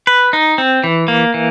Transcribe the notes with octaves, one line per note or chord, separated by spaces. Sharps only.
B4
D#4
C4
E3
A#3
E3